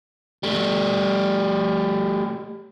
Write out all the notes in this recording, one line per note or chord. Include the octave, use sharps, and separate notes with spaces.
G3 A3